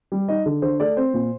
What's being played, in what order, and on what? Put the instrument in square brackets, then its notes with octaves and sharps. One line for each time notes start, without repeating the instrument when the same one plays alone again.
[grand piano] G3
D#4 D#5
D3
D3 C5
A3 D5
C4 C5
A#2